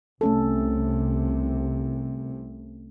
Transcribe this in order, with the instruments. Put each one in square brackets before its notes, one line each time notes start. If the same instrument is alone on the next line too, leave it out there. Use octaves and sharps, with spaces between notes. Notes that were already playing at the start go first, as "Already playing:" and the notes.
[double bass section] C2 C3 [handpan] A3 C#4 A4